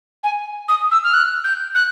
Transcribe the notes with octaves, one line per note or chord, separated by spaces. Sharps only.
G#5
D#6
E6
F6
F#6
G6
F#6